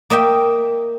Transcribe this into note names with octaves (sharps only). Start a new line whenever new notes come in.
A#3 D#5 E5 G5